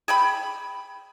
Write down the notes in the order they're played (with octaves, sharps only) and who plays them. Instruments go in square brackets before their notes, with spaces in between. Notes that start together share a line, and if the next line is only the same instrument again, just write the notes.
[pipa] G#4 G5 B5